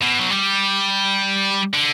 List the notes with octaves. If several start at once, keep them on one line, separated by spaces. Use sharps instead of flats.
B2
F#3
G3
D3